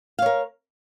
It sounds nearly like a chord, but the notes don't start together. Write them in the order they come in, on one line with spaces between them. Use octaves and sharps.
F5 C#5 A#4